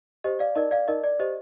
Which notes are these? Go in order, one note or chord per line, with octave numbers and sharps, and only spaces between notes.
G4 C5 D#5
D5 F5
D#4 A#4 D5 D#5
D5 F5
D#4 A#4 D5 D#5
D5
G4 C5 D#5